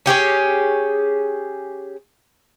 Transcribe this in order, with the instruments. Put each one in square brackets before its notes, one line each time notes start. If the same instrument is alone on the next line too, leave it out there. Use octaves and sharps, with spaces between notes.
[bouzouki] C#4 G4 G#4 C#5